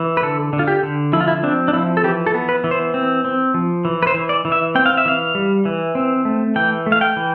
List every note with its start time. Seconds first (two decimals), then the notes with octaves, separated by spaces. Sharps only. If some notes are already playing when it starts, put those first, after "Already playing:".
Already playing: E3
0.17 B4
0.23 D3 A4
0.53 D3
0.59 F4
0.68 G4
0.83 D3
1.13 F3 E4
1.21 F4
1.28 E4
1.43 C4 D4
1.68 D4
1.73 F3 E4
1.97 A4
2.04 E3 G4
2.27 A4
2.34 B3
2.49 B4
2.64 E3
2.71 C5
2.94 C4
3.25 C4
3.54 F3
3.85 E3
4.03 B4
4.07 C5
4.14 E3
4.29 D5
4.45 E3
4.52 E5
4.75 C4 G5
4.86 F5
4.97 E5
5.05 E3 F5
5.35 G3
5.65 E3
5.95 C4
6.25 A3
6.56 E3 G5
6.86 A3
6.92 F5
7.01 G5
7.16 E3